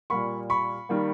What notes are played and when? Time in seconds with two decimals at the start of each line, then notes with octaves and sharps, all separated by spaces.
0.10 A#2 G3 A#3 B5 C#6
0.50 B5 C#6
0.89 D#3 G3 A#3